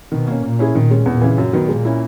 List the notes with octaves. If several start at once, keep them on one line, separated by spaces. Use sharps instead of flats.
B2 D#3
A#3 C#4
A#2 A#3
C#4 E4 G#4
A#2 D#3
G#3 C#4
E2 A#2
C#3 E3
F#2
D#3 F#3 B3
A#2 G#3
C#4 E4